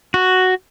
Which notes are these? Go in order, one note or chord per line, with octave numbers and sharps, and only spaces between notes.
F#4